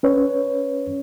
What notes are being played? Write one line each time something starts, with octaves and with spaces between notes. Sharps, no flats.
C#4 B4 C#5